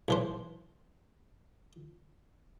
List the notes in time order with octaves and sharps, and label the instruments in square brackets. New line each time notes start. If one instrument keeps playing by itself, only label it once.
[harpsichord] B1 E3 C5